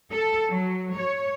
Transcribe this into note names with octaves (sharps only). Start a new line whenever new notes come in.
A4
F#3
C#5